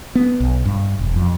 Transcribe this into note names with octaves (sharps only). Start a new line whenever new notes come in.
B3
B1
G2
E1
F2